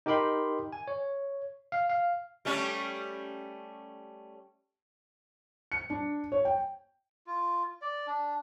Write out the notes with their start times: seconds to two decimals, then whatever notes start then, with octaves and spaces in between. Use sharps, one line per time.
0.06 D#4 G4 A#4 G5 B5 C6
0.73 G#5
0.88 C#5
1.72 F5
1.90 F5
2.45 G3 A3 C#4
5.72 C#7
5.90 D4
6.32 C#5
6.45 G5
7.27 F4
7.82 D5
8.07 D4